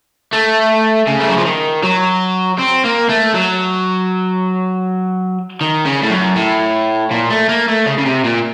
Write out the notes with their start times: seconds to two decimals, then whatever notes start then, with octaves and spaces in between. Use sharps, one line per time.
0.33 A3
1.07 C#3
1.21 A3
1.29 F#3
1.38 F3
1.46 D#3
1.83 F#3
2.58 C4
2.84 A#3
3.09 A3
3.34 F#3
5.61 D#3
5.85 C#3
6.02 A2
6.10 F#2
6.35 A2
7.11 A#2
7.30 A3
7.49 A#3
7.68 A3
7.86 C#3
7.98 C#3
8.06 C3
8.24 A#2